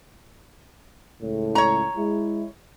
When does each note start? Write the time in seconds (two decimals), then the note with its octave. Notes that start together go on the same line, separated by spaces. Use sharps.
1.22 C#2 A2
1.55 C#5 A#5
1.96 G#3 E4